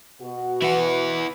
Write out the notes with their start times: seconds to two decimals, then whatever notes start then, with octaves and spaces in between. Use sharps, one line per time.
0.22 B2 F#4
0.62 E3 E4 F#5